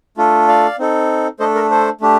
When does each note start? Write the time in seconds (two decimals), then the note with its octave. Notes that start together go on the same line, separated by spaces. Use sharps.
0.17 A3 D4 F4 A4
0.48 D5 F5
0.79 C4 D#4 A4
1.39 A3 D4 A4 C5 D#5
1.55 A#4
1.71 A4 C5
2.01 A3 D4 G4